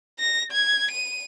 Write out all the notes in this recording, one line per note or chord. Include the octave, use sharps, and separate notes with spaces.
A#6
G#6
D#7